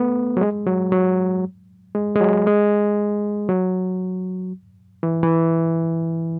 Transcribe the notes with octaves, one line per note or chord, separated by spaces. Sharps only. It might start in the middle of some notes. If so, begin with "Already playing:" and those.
Already playing: A3 B3
F#3
G#3
F#3
F#3
G#3
G#3
F#3
G#3
F#3
E3
E3